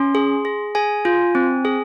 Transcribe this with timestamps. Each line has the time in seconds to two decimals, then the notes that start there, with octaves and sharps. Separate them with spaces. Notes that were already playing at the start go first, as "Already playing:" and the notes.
Already playing: C#4 C6
0.15 G#4
0.45 G#4
0.75 G#4 G#5
1.05 F4
1.35 C4
1.65 G#4